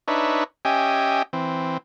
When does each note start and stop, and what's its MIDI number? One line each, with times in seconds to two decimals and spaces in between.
0.08 0.44 62
0.08 0.44 63
0.08 0.44 71
0.08 0.44 73
0.08 0.44 76
0.65 1.23 61
0.65 1.23 67
0.65 1.23 75
0.65 1.23 76
0.65 1.23 79
0.65 1.23 80
1.33 1.78 52
1.33 1.78 60